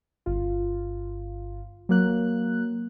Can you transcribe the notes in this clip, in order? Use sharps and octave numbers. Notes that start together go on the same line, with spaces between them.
G1 F4
F#3 A#3 F#6